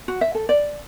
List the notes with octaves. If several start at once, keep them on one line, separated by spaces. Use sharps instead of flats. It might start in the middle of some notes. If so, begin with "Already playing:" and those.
F#4
E5
A4
D5